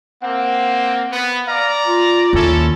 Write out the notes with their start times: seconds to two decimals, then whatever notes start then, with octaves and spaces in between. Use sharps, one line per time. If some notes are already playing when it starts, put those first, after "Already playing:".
0.22 A#3 C4 F#5
1.12 B3
1.47 D5 F5 A#5
1.86 F4
2.33 D#2 C#4 E4 A4